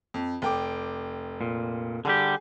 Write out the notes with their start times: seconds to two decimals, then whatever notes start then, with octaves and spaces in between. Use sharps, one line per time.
0.14 F2
0.42 F1 G5 D6
1.41 A#2
2.05 D3 G3 G4 G#4